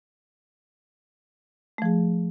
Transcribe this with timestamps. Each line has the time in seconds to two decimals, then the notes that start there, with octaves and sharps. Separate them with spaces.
1.78 A3
1.82 F3
1.86 G#4